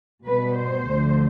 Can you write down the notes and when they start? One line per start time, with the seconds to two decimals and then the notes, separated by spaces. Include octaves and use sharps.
0.25 B2 G3 B3 B4
0.55 C5
0.86 D2 D3 F3